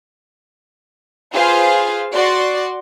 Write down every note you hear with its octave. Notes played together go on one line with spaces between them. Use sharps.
F4 G#4 B4 C5 F5
F#4 D5 C6